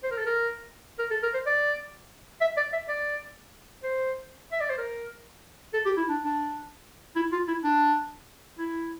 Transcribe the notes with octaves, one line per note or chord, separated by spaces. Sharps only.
C5
A#4
A4
A#4
A#4
A4
A#4
C5
D5
E5
D5
E5
D5
C5
E5
D5
C5
A#4
A4
G4
E4
D4
D4
E4
F4
E4
D4
E4